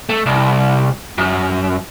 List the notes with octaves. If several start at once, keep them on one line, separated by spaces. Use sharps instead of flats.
A3
C2
F#2